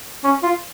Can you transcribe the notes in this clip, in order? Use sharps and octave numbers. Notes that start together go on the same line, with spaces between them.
C#4
F4